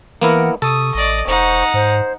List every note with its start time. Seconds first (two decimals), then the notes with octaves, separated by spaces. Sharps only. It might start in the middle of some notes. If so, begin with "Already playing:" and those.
0.22 E3 A#3 B3 E4 A#4 F#5
0.62 C3 A4 C#6 D#6
0.95 A1 D5 D#5
1.27 E1 D#4 C5 F#5 C#6
1.74 G#2 C5